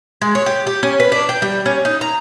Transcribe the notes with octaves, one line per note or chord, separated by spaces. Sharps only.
G#3
C#5
G4
G4
C#4
B4
D4
G5
G3
C#4
D#4
A#5